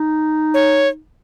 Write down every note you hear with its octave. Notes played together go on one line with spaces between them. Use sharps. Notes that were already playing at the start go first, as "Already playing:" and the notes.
Already playing: D#4
C#5